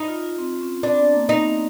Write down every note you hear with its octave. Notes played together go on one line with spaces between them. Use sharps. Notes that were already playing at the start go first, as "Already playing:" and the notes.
Already playing: D#4
F4
F4
C4
C#4
C4 D4
B3
A#3
B3 D#4